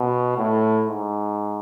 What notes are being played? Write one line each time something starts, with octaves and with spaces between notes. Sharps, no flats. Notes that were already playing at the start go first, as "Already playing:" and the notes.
Already playing: B2
A2
G#2